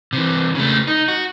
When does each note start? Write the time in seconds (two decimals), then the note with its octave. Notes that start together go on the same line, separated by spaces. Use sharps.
0.13 C3 E3
0.55 C#3 A3
0.87 D#4
1.08 F#4